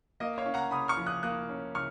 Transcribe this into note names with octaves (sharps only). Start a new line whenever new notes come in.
A#3 D#5
C#5 F5
C#4
F#5 A#5
C#3 B5 D#6
C#6 F6
F3
D#6 F#6
A#3 D#6 F#6
C#4
C#3 C#6 F6